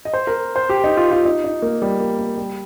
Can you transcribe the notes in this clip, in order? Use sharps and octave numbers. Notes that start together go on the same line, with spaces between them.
D#5
C5
A#4
C5
G4
D#4
F4
F4
D#4
D#4
A#3
G3
A#3
A#3
G3